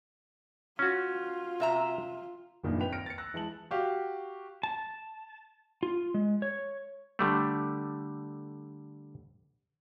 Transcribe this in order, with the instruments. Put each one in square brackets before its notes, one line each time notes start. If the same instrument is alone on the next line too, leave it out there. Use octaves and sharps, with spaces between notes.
[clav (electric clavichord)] C#4 F#4 [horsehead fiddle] F4
[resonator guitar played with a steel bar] C3 E5 A#5
[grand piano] F#1 G2 A#2 D#3 F3
C4 B4 G5 F7
F6 A#6 C#7 D7
A6 C#7
E6 F#6 A#6
E3 G#3 A5 F#7
F#4 G4 F5
[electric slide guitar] A5
F4
G#3
C#5
[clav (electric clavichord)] D3 G3 A3